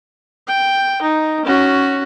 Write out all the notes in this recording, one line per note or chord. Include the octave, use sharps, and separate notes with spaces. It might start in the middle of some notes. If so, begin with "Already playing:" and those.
G5
D#4
C#4 F#4